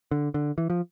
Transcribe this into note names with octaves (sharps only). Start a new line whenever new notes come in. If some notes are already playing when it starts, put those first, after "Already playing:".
D3
D3
E3
F3